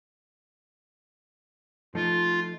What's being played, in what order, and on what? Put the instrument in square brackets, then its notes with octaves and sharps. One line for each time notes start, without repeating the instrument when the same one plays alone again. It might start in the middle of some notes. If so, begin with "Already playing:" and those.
[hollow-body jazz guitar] F3 A3 D#4 [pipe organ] F4